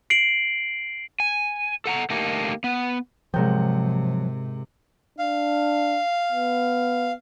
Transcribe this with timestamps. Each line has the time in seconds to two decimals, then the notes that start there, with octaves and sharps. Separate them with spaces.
0.10 C7 D7 F#7
1.20 G#5
1.86 A4 F#5 A#5
2.10 D3 A3 A#3 D#4 G4 A#4
2.64 B3
3.34 G#2 C3 F3 F#3 A#4 G5
5.19 D4 F5
6.32 B3